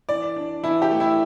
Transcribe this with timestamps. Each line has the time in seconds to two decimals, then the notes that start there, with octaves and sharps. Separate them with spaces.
0.09 E3 D5
0.36 D4
0.63 E3 E4
0.82 G4
0.91 A3
1.00 E4